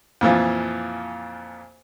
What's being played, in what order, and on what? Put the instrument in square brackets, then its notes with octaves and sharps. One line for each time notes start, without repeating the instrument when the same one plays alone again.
[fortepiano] F2 A#2 E3 F3